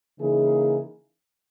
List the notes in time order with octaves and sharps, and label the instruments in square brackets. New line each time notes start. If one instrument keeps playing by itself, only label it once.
[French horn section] C#3 E3 A#3 D#4 G#4